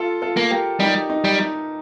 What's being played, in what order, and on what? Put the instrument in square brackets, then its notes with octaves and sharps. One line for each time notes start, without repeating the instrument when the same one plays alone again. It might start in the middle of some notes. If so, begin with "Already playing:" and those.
Already playing: [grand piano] F4 A4
F4 A4
[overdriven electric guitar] A#3
[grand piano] G4 A#4
[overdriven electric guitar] G3 [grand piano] D#4 G4
[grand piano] D#4
[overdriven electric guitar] G3
[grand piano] D#4